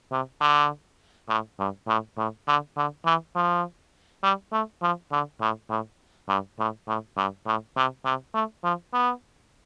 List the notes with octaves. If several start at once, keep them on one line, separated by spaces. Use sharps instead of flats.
C3
D3
A2
G2
A2
A2
D3
D3
E3
F3
G3
A3
F3
D3
A2
A2
G2
A2
A2
G2
A2
C3
C3
A3
F3
B3